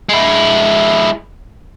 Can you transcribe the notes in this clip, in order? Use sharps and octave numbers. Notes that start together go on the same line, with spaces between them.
G#3 E4